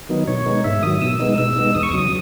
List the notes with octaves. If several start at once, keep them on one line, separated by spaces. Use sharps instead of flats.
D#3 F#3 B3 D#4
B2 C#5
G#3 B3 D#4
G#2 E5
D#3 F#3 D#6
B2 E6
G#3 B3 D#4
B2 E6
G#3 B3 D#4
E2 D#6
C#6
C#3 F#3 D#6